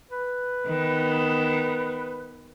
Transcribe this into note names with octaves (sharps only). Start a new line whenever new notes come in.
B4
D#3 B3